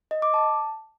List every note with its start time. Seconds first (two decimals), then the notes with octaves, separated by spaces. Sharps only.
0.11 D#5
0.22 D6
0.34 A5